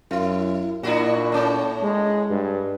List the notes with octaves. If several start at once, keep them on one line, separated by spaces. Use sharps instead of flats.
F#2 E4
A#2 D4 E4 F#4
A2 C#4
G#3
G2